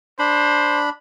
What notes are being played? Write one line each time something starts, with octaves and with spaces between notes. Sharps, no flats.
D4 C5 B5